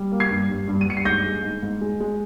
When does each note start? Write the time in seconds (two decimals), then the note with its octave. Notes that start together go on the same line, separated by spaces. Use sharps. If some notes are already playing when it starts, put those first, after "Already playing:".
Already playing: G3
0.12 A#3
0.20 G#6 C7
0.30 G2
0.49 G2
0.68 G2
0.81 D#7
0.86 G2 C#7
0.97 C7
1.05 G#2 G6 A#6
1.24 G#3
1.43 G#2
1.63 G#2
1.81 G#3
2.00 G#3